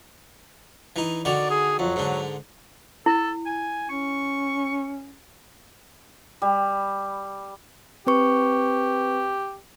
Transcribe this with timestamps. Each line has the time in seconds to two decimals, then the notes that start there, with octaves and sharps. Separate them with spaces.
0.96 E3 D#4
1.25 D3 D#3 F#4 D5
1.50 G#4
1.79 F2 F#3
1.96 G#2 D3
3.06 E4 A4
3.46 G#5
3.89 C#4 C#6
6.42 G3
8.07 C4 G4 B4 C#6